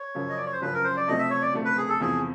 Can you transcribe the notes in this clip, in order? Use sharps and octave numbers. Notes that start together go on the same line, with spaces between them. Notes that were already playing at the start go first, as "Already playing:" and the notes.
Already playing: C#5
F#2 C#3 F3
D#5
D5
C#5
C5
F#2 C#3 F3 B4
A#4
C5
D5
C3 F3 A3 D#5
E5
C#5
D5
C3 F3 A3
B4
G#4
A4
E2 C3 F3 G#4